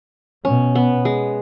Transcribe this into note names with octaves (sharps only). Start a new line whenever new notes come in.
B2 C#4
B3
G#3